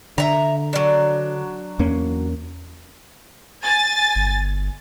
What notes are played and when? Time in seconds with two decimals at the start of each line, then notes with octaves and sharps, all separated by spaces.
0.18 D3 E5 A#5
0.73 F#3 D4
1.79 E2 A#3 C#4
3.64 G#5 A6
4.15 G1